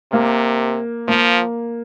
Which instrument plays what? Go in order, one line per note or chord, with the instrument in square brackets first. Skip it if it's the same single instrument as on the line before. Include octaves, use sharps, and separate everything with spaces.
[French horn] C3 [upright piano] A#3
[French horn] F3 [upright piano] A#3